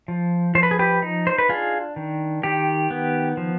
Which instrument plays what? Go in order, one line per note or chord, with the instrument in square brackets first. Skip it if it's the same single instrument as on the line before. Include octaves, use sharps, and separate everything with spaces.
[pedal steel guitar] F3
F3 C5
B4
G#4
G4 B4
D#4
C5
B4
D4 F4 G#4
D#3
D#3 G4
B3
F3